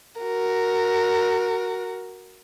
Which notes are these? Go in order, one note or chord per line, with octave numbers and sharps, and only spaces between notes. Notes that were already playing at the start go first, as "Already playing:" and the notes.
F#4 A#4